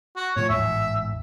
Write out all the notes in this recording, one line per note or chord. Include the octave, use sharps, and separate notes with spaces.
F#4
A2 F3 C#5
A1 E2 G#2 E5